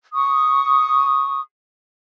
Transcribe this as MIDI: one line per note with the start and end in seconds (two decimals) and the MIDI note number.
0.14 1.40 85
0.14 1.40 87